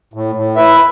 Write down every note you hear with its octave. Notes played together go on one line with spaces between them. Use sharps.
A2
A2
E4 B4 E5